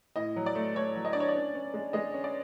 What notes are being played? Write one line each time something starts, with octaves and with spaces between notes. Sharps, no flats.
A2 D#5
F#3
D5
A3
A3 C#5
F#3
D#5
D4 D5
C#5
D5
C#4
C#4
G#3
G#3 D#5
C#4
D5